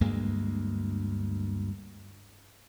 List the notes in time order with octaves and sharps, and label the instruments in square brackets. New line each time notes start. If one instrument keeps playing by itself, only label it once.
[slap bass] D2 G2 G#3 A#3